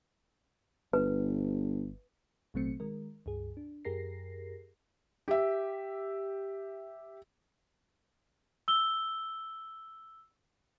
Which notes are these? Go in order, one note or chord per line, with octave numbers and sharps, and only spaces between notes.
G1 B4
A1 B2 F#3 A3 C4 C#7
D#3 G#3 A#4
C#2 G2 G#4
D4
F#2 G4 G#4 A#4 A#6 C7
G4 E5
E6 G7